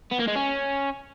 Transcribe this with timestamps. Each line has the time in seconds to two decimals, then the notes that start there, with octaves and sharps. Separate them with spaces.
0.11 B3
0.19 A#3
0.28 G#3
0.36 C#4